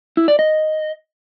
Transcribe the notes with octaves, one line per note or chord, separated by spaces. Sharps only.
E4
D5
D#5